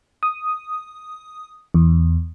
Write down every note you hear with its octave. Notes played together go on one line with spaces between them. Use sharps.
D#6
E2